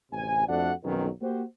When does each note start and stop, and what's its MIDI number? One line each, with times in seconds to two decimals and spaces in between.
0.12 0.43 33
0.12 0.43 38
0.12 0.43 48
0.12 0.43 80
0.48 0.71 41
0.48 0.71 57
0.48 0.71 62
0.48 0.71 66
0.48 0.71 74
0.48 0.71 78
0.83 1.08 35
0.83 1.08 41
0.83 1.08 51
0.83 1.08 54
0.83 1.08 59
0.83 1.08 61
1.22 1.42 58
1.22 1.42 66
1.22 1.42 67
1.22 1.42 72